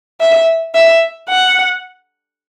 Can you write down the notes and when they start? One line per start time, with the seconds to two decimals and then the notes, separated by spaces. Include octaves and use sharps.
0.21 E5
0.74 E5
1.29 F#5